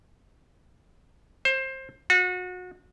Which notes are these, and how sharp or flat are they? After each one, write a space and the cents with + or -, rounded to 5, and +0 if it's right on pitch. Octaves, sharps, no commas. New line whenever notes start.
C5 +20
F#4 -30